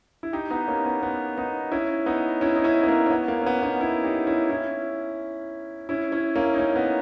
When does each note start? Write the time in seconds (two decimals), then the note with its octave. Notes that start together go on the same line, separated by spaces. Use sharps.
0.23 E4
0.33 D#4 G4
0.50 B3 D#4
0.68 A#3 C#4
0.85 B3
1.03 B3
1.38 B3 D#4
1.72 C#4 E4
2.06 B3 D#4
2.41 C#4 E4
2.56 D#4
2.64 C#4 E4
2.83 B3
2.87 A#3 C#4
3.06 C#4
3.11 B3
3.28 A#3
3.41 C#4
3.46 B3
3.63 B3 D#4
3.81 C#4 E4
4.04 D#4 G4
4.27 C#4 E4
4.50 C#4 E4
5.89 C#4 E4
6.12 C#4 E4
6.36 A#3 C#4
6.54 D#4
6.58 A#3 C#4
6.76 B3